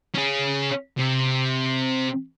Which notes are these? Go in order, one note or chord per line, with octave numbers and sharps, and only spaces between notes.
C#4 G#4
C3